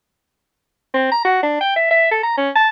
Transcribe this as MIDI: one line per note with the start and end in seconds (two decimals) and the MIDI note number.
0.94 1.07 60
1.12 1.20 82
1.25 1.40 66
1.43 1.56 62
1.61 1.75 79
1.76 1.86 76
1.91 2.10 76
2.11 2.19 69
2.23 2.36 82
2.37 2.50 61
2.55 2.68 81